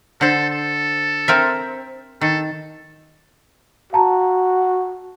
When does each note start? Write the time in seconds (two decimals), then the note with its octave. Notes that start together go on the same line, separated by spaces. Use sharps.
0.21 D3 A4 C5
0.50 A4
1.28 C4 A#4 E5
2.21 D#3 A4
3.93 F#4 F5 A5 A#5